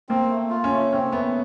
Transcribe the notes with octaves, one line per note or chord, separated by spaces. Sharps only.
A#3 C4
A3
F4
C#4
A3
C4 C#4
A3 B3